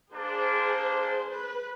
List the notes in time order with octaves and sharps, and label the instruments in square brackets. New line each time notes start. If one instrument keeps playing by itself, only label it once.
[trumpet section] A#3 D4 [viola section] G#4 C5
[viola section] B4